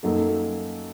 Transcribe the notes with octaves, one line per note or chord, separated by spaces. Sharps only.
F#2 F#3 A#3 D#4 A4